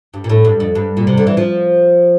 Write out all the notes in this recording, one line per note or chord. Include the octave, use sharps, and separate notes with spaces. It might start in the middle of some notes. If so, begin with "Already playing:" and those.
G2
A#2
A2
G2
F2
G2
A#2
C3
D3
E3
F3